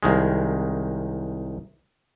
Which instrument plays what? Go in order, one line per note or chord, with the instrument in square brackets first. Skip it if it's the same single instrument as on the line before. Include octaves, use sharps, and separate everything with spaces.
[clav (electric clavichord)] C2 D#3 G#3